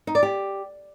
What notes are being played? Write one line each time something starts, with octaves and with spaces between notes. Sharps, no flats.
D#4
D5
G4